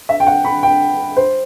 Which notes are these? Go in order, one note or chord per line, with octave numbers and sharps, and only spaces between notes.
E5
G5
F#5
B5
G5
C5